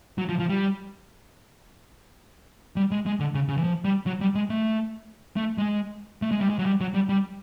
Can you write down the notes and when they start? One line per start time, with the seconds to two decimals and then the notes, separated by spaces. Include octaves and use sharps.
0.18 F#3
0.29 F3
0.39 F3
0.49 G3
2.76 G3
2.91 G#3
3.06 G#3
3.20 D3
3.34 C#3
3.49 C#3
3.58 E3
3.64 F3
3.85 G3
4.07 F#3
4.21 G3
4.35 G#3
4.50 A3
5.36 A3
5.58 G#3
6.22 A3
6.31 G#3
6.41 G3
6.50 G#3
6.59 F#3
6.66 G3
6.81 F#3
6.94 G3
7.09 G3